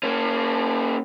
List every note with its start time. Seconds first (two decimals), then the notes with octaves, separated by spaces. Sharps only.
0.03 A#3 C#4